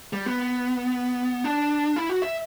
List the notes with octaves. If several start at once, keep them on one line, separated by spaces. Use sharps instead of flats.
G3
B3
D4
E4
F#4
E5